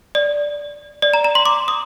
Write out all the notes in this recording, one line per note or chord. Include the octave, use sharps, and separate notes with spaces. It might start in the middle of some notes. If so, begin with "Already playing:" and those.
D5
D5
A#5
A#5
C6
D6
D#6